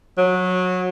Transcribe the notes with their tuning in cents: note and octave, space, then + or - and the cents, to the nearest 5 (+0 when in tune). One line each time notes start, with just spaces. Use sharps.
F#3 -20